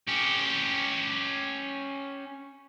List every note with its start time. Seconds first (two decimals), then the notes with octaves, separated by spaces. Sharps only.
0.07 C#4 G4